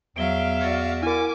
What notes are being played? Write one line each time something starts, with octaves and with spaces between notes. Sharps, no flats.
E2 F#3 E5 F5 D7 G7
F#4 D5
E4 A#4 G#5 D6